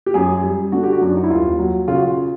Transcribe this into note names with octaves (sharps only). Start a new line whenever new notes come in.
G4
F#2 G#4
G3
D3 F#4
G4
F#4
F#2
D4
D#4
E4
D#2 F4
F#3
C#3 F4
F#4
F4